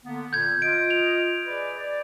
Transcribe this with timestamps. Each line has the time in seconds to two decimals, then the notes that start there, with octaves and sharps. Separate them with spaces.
0.04 D3 A#3 B3
0.33 A#2 D3 G6 G#6
0.62 F4 D#5 D7
0.90 F7
1.46 G#4 B4 D5
1.77 D5